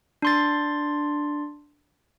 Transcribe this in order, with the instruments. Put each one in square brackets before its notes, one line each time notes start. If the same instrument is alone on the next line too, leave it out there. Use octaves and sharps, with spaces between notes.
[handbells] D4 C6 A6